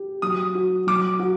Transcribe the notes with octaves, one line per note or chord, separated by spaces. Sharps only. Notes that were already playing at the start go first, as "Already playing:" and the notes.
Already playing: G4
F#3 D#6
F#4
F#3 D6
F#4